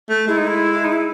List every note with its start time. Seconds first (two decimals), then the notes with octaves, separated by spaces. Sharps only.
0.09 A3
0.27 G#3 E4
0.37 D#4
0.47 E4
0.84 D#4
0.92 E4